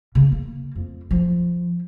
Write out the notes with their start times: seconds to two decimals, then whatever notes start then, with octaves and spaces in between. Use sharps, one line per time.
0.15 C#3
0.32 A#3
0.75 F2
1.11 F3